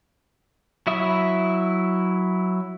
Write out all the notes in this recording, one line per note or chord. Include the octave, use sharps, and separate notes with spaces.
F#3 E4 E5 D#6